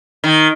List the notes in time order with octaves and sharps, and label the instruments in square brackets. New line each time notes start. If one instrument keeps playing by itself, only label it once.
[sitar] D#3